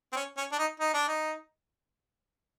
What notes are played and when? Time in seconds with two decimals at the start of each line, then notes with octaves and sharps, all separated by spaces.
0.12 C4
0.16 C#4
0.37 C#4
0.52 D4
0.59 D#4
0.80 D#4
0.94 D4
1.08 D#4